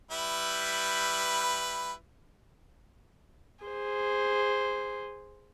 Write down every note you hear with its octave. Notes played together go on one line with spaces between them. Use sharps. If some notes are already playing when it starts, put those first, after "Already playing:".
G3 E4 B4
G#4 C5